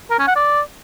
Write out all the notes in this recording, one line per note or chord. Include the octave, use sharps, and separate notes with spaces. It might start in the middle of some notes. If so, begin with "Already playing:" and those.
A#4
C#4
F#5
D5